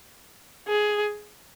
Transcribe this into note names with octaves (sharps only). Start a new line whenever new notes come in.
G#4